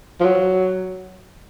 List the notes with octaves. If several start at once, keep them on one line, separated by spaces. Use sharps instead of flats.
F3
F#3